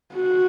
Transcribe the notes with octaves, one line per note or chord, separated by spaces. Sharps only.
F#4